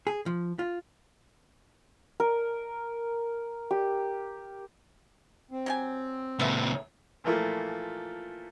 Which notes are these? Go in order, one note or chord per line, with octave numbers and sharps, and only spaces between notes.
G#4
F3
F4
A#4
G4
C4
F#3 G4 G#5
C#2 A#2 B3 A4 E5
A#2 E3 F3 A3 A#3